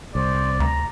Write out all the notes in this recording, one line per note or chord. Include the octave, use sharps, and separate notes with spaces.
C2 C5 D5
D2 A#5